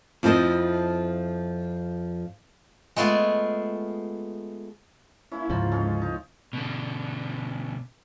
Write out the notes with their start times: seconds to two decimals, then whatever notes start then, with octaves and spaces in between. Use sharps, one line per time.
0.23 F2 F3 E4 A4 D#5
2.96 G#3 A3 B3 F4 G#4
5.32 A#3 C#4 E4
5.49 D2 G#2 C#3 F3 E4 F4 A#4
5.71 G#3 C#4 A4
6.02 D#4
6.53 B2 D3